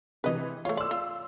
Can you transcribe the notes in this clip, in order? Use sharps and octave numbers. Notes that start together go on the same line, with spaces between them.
C3 E3 B4 D#5
A3 F4 C#5
D5 C6 E6
F4